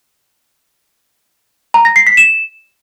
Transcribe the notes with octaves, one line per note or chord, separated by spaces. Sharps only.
A#5
A#6
C7
B6
E7